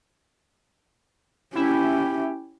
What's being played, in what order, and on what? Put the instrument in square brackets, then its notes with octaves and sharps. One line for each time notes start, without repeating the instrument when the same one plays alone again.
[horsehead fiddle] C#4 G4 [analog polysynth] E4